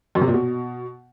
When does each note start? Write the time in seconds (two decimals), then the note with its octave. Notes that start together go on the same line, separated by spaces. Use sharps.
0.15 F#2
0.21 C3
0.28 A#2
0.34 B2